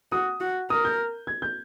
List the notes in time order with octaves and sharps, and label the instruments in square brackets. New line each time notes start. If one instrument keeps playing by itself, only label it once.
[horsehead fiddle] F#4 [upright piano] D#6
[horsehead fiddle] F#4
[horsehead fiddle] A#4 [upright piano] D#6
[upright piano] G6
G#6
G6